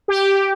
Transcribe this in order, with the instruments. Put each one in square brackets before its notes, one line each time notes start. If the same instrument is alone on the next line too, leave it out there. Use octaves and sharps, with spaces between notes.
[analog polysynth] G4